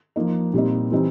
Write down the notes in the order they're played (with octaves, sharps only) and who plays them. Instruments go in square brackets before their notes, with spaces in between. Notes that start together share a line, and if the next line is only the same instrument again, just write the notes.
[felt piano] F3 A#3 D#4
A#2 G3 C4 D#4
E3 G3 C4 D#4